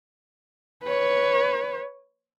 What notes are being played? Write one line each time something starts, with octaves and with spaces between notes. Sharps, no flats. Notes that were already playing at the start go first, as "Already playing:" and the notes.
B4 C#5